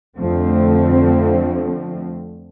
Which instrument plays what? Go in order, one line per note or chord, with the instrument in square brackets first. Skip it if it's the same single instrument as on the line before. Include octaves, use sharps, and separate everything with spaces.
[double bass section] F2 D3 F3 A3 C4